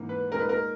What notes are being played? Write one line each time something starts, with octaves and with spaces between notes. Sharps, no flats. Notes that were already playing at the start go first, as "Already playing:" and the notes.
Already playing: G#2 E3 A#3
B4
A#2 G#3 D#4 A#4
B4
A#4